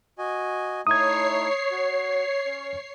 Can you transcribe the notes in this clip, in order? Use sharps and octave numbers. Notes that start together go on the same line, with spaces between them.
F#4 D#5 G#5
A3 D#4 E4 C#5 D#6 G#6 C7
F#4
C#4